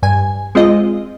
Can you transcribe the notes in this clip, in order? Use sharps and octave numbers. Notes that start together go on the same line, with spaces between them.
G2 G#5
G#3 C4 F4 D#5